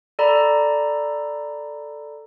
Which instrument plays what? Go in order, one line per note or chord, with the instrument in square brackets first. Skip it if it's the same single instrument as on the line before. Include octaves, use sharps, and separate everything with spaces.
[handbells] A4 D5 A#5 B5